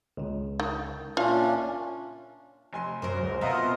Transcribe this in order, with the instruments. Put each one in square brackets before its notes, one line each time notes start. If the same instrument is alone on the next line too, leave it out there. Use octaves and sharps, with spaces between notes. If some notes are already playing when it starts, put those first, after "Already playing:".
[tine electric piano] C#2 C#3
[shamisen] D#3
[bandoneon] A#2 C#4 D4 [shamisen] F4 F5 [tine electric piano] E5
[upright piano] F1 G#5 C6
[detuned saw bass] F#2 [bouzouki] A#4 C5
[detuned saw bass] C#2
[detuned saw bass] B2 [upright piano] B3 E5 F#5 [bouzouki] C4 [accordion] F4 A#4 D#5